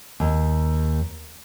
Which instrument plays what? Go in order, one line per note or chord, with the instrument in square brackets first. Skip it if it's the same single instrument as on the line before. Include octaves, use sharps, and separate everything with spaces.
[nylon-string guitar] D#2